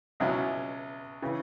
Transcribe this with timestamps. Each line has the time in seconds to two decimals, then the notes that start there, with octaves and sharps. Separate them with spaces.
0.20 C#2 B2 F#3 C#4 E4
1.22 C#3 E3 C#4